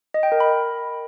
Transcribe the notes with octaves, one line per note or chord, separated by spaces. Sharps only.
D#5
G5
A#4
B5